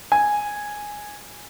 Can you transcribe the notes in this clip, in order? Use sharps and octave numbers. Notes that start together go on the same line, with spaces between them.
G#5